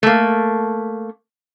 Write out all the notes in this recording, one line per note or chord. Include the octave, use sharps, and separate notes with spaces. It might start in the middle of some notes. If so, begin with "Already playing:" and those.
A3 A#3